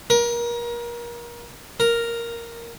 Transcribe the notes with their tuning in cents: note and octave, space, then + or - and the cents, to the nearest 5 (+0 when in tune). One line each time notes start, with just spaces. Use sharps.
A#4 +30
A#4 +0